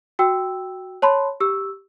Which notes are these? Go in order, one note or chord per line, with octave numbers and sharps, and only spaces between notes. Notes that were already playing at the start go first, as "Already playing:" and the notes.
F#4 G5 E6
C#5 A5 B5 C6
G4 E6